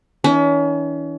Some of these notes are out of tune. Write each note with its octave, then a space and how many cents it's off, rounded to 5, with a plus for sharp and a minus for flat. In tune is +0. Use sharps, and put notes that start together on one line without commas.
E3 -40 C#4 +35